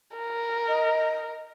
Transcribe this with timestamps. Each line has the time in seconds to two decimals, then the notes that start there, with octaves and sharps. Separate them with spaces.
0.18 A#4
0.68 D#5